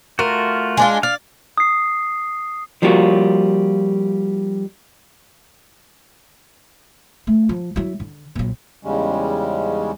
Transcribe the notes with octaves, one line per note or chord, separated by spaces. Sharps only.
A3 F4 F#4 A#4
G#3 D4 F4
D5 F5
D#6 C7
F3 G3 A#3 F4 F#4
A3
F3
F#3 E4
D3
A#1 F#3
E2 G#2 C#3 G3 G#3 C#4